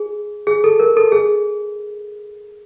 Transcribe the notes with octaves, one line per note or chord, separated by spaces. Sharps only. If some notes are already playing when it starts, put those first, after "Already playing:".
Already playing: G#4
G#4
A4
A#4
A4
G#4